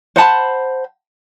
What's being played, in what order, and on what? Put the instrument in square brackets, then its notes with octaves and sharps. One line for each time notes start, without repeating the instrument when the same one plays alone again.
[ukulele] C5 F#5 A5 B5